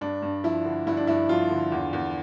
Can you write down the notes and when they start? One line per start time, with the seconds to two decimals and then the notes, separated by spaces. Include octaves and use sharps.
0.01 G2 D4
0.22 G2
0.44 F3 E4
0.65 D3
0.87 G2 E4
0.97 D4
1.07 G2 E4
1.29 F3 F4
1.51 D3
1.72 E2
1.93 E2